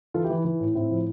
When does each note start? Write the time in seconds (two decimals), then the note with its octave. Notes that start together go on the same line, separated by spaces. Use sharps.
0.14 E3 F4 A4
0.24 E4 G4
0.30 E3
0.45 E3
0.60 A2
0.75 A2 C4 E4
0.91 F3